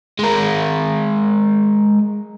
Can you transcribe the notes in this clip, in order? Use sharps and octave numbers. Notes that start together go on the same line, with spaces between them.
G#3 A#4